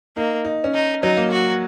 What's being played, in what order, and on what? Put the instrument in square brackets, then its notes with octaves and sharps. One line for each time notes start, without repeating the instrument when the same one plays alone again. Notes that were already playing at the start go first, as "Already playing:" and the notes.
[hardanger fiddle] A#3 [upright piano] D#4
[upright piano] D#4
C#4
[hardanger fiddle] D#4
[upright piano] F#3 [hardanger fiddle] D#4
[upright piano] A#3
[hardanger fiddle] F#4